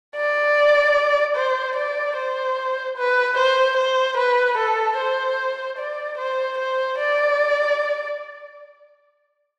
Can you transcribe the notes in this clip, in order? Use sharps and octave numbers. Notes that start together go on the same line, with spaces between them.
D5
C5
D5
C5
B4
C5
C5
B4
A4
C5
D5
C5
C5
D5